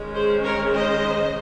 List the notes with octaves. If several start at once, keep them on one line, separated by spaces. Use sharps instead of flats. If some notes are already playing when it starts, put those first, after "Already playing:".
Already playing: D#3 G#3 C#4
G#4 C5
A#4 C#5
C5 D#5